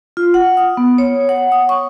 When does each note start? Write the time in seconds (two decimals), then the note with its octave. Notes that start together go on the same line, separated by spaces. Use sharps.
0.17 F4
0.34 F#5
0.57 D#6
0.77 B3
0.98 C#5
1.29 F#5
1.52 D#6
1.69 C#6